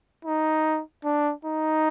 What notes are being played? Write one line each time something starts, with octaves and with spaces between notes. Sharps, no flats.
D#4
D4
D#4